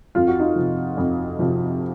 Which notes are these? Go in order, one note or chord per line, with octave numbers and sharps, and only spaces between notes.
F2 F4
F#4
D#4 F4
C3 F3
F2
C3 F3